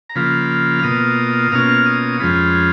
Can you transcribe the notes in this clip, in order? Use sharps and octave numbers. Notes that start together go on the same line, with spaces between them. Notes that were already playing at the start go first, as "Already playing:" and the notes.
A#5
C#3 F3 A#3 F4 B5
F6
B2 A#3 F4 D#6
B2 A#3 C#4 F4 F6
D#6
F2 F3 G#3 C#4 F4 B5